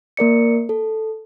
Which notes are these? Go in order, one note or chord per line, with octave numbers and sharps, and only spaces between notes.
A#3 A#4 D5 C#7
A4